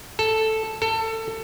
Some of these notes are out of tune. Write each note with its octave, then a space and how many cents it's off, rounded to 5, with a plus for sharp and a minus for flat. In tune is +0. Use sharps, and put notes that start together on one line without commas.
A4 +0
A4 +25